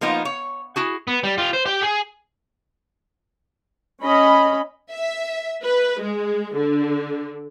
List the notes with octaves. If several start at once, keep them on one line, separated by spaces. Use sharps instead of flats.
F3 A#3 B3 D#4 F4
C#5
E4 F#4 G#4
B3
G3
F4 G4
C5
G4 G5
G#4
C#4 D#5 B5
E5
B4
G#3
D3